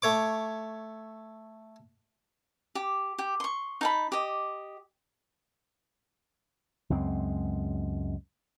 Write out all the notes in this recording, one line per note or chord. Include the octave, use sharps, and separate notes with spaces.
A3 C#5 D6
G4
G4
C6 C#6
D#4 A5 B5
G4 D#5
C#2 F#2 G#3 C4